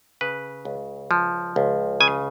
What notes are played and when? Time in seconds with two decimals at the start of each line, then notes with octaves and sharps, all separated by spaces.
0.21 C#3 B4
0.65 C#2
1.11 F3
1.56 C#2
2.00 C#3 G#5